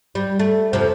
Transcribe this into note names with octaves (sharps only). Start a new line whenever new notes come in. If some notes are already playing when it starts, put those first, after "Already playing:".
G3
A3
F2 C3